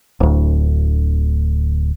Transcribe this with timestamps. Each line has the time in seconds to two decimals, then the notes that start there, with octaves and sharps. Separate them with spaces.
0.20 D1 D2